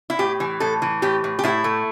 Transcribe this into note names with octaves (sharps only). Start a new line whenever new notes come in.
E4
A2 G4
E3
A2 A4
E3
A2 G4
A2
G4
A2 E4
A3